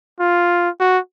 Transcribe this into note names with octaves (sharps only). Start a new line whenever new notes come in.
F4
F#4